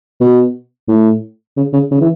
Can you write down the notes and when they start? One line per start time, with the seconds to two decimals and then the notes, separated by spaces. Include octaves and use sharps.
0.20 B2
0.88 A2
1.57 C#3
1.73 C#3
1.91 C#3
2.00 E3